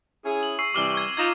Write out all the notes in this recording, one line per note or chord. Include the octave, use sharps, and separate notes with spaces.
C#4 E4 G#4
F#7
C#6 E6 C7
C3 E3 G3 D6 F6 G7
C#6 D6 G#6
D#4 F4 G#6 E7 F7